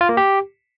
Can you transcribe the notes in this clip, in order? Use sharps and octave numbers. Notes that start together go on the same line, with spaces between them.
F4
A#3
G4